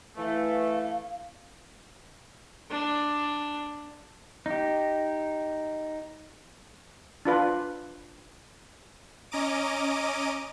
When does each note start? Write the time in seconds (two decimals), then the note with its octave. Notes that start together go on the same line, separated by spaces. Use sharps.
0.17 E3 A3 F5
2.71 D4
4.46 D#4 G4
7.25 D4 F4 B4
9.31 C#4 D#5 A#5 D6 D#7